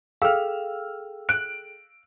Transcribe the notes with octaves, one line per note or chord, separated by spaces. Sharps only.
G#4 A4 F5 G5 E6 F6
F#6 D7